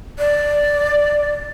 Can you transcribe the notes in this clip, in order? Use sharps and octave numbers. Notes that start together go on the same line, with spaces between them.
D5